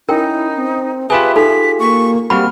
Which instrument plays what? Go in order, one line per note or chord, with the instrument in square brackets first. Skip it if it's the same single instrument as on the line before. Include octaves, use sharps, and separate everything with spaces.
[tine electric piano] C#4 [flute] D#4 [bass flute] E4 [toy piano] A#4 G5
[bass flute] C4
[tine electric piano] F4 G4 G#4 [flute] B4 [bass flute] E5 [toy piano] G#5
[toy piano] D#4 A4 [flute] B6
[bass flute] A#3 [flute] C#6
[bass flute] G3 [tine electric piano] A#3 C4 F#4 [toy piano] B5 [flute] F6